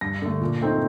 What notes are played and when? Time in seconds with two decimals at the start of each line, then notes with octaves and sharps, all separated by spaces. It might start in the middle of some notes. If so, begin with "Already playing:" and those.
0.01 G2 A#6
0.22 D3 A3
0.41 A#2
0.61 A3 C4 D#4